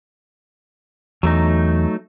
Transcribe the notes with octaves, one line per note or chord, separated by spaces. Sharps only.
E2 F#3 A3 D#4